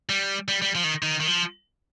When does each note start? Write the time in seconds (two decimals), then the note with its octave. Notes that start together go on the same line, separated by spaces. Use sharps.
0.09 G3
0.48 G3
0.62 G3
0.75 F3
0.84 D#3
1.03 D#3
1.20 D#3
1.27 F3